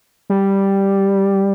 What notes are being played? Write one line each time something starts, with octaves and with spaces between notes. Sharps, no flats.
G3